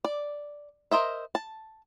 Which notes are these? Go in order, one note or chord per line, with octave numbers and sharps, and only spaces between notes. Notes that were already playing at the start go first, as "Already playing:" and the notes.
D5
A#4 C5 D#5 E5
A5